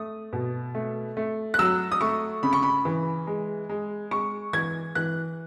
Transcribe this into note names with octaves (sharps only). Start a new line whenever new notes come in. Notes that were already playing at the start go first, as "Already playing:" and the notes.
Already playing: A3 D#6
B2
A3
A3
F#6
F#3 E6
D#6
A3 C#6
C#3 B5
C#6
B5
E3
G#3
G#3
G#3 C#6
E3 G#6
E3 F#6